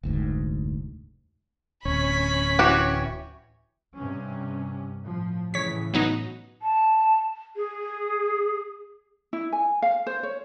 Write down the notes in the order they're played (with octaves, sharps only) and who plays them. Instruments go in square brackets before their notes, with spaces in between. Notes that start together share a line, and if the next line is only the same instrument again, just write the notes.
[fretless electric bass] F1 D2 G#2
[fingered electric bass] D1 [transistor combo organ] C#4 [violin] B5 B6
[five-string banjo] E3 F#4 G4
[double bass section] G2 C3 C#4
A2 F3
[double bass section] A2 C#3 E3 [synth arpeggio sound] C#5 B6
[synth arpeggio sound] F#3 B3 D#4
[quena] A5
G#4
[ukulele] E4
G#5
F5
C5
C#5